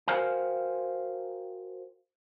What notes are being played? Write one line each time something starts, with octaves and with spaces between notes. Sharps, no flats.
F#4 A#4 C5 F5 G5 G#5